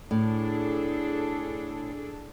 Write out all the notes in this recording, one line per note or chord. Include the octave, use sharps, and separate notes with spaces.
A2 D4 G#4 A4